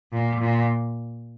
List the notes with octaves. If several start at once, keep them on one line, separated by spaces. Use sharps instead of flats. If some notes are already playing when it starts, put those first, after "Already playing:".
A#2
A#2